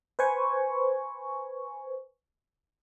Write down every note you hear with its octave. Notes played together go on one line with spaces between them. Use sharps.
B4 C5 G#5 C#6